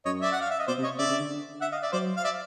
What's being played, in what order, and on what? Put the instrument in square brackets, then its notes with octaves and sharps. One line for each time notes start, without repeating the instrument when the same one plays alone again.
[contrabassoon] F#2 [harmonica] C#5 D#5
[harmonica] D5 E5
F#5
F5
E5
D#5
[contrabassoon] B2 [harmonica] C5 D5
[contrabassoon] C3
[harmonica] C#5 D#5
[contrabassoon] C#3 [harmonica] D5 E5
[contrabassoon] C#3
D3
[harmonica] E5 F#5
D#5 F5
D5 E5
[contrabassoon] F#3 [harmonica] C5 D5
[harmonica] F5
D5 E5